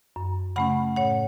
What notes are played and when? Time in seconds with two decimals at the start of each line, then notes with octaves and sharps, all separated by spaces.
0.16 F#2
0.56 C#3 A3 C#4 F#5 B5
0.96 A2 C#5 F#5